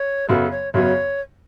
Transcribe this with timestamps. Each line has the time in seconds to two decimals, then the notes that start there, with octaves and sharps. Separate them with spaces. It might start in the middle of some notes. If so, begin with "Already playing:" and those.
Already playing: C#5
0.29 F#2 C#3 F#3 B3 A4
0.51 C#5
0.73 F#2 C#3 F#3 B3 C#5